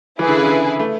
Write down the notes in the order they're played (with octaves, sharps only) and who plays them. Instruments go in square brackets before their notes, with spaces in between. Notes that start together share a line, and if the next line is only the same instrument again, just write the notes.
[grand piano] E3 [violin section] E4 G#4 B4
[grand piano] D3
C#3
D3
A3